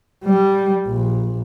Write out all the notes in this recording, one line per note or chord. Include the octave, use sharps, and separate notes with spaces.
G3
A#1